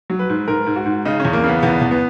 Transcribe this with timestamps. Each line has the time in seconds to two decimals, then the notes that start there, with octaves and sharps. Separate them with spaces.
0.10 F#3
0.19 B4
0.29 G#2
0.48 G#2 A#4
0.66 G#2
0.76 F#4
0.86 G#2
1.05 C#3 D#4
1.20 E2 C#4
1.33 A#3
1.44 C#3 B3
1.62 E2 B3
1.81 E2
1.91 B3